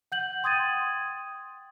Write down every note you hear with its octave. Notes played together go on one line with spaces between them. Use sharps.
F#5 G6 F#7
G5 C6 D#6 G#6 A6 D#7